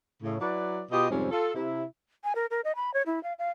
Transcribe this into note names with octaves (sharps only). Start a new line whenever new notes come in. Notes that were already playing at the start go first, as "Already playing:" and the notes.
A2 C#3
F#3 E4 F#4 B4 D5
B2 F4 G4 D#5
F2 G#2 C3 G3 C4 C#4
F4 A4
C3 E4
G#5
A#4
A#4
D#5
B5
C#5
E4
F5
F5